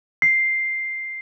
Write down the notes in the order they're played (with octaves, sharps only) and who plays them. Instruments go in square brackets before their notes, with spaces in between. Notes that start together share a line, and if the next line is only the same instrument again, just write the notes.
[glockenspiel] C7